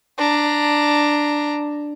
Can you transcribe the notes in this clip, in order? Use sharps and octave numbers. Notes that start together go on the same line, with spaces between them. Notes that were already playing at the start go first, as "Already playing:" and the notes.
D4 A#5